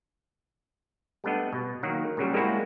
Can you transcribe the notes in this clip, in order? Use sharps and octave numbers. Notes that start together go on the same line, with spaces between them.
G3 A3 B3 D4 D#5 F#5
B2
D#3 F#3 A#3
A#2 C#3 F#3 G3
G3 G#3 A#3 C4 E4 F#4